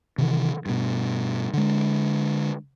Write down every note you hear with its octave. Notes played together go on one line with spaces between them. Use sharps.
C3 D#3 E3
G2 B2
D3 G#3